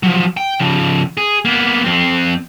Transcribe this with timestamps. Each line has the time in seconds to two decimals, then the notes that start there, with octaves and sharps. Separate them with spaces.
0.03 F3 F#3
0.37 G5
0.60 C#3 F3
1.17 G#4
1.45 A#3 B3
1.85 F2 C4